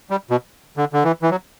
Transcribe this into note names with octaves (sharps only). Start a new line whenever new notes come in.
G3
B2
D3
D3
E3
E3
F#3